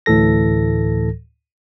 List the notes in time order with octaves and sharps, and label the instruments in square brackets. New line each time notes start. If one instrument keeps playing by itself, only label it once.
[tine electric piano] D2 A2 E3 A4 A#6